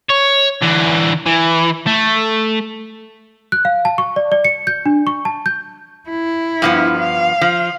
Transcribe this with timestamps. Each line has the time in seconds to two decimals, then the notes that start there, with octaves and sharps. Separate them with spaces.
0.09 C#5
0.62 D3 E3
1.26 E3
1.87 A3
3.52 F#6
3.65 F5
3.85 A5
3.98 C#6
4.16 D5
4.32 D5
4.45 C#7
4.67 G6
4.86 D4
5.07 C#6
5.25 A5
5.46 G6
6.10 E4
6.62 G2 F3 B3
6.99 F5
7.41 F3